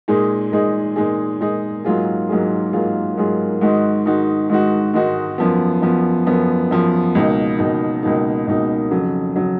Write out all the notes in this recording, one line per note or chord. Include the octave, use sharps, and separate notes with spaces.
A#2 G#3 D#4 G#4
A#2 G#3 D#4 G#4
A#2 G#3 D#4 G#4
A#2 G#3 D#4 G#4
G#2 F#3 A#3 F4 G#4
G#2 F#3 A#3 F4 G#4
G#2 F#3 A#3 F4 G#4
G#2 F#3 A#3 F4 G#4
G#2 D#3 G#3 D#4 F#4
G#2 D#3 G#3 D#4 F#4
G#2 D#3 G#3 D#4 F#4
G#2 D#3 G#3 D#4 F#4
F#2 F3 B3
F#2 F3 B3
F#2 F3 B3
F#2 F3 B3
C#2 B2 A#3 D#4
C#2 B2 A#3 D#4
C#2 B2 A#3 D#4
C#2 B2 A#3 D#4
F2 C#3 F#3
C#3 F#3